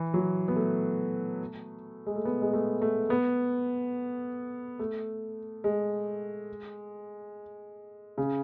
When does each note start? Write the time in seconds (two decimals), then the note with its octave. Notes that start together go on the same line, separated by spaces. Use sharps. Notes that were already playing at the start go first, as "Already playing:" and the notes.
Already playing: E3
0.14 F#3
0.48 B3
0.56 A3
2.07 G#3
2.16 A3
2.25 B3
2.42 G#3
2.54 A3
2.82 A3
3.10 B3
4.79 A3
5.64 G#3
8.18 C#3